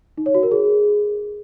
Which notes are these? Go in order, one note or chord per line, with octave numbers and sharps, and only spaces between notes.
D#4
C#5
F#4
A#4
G#4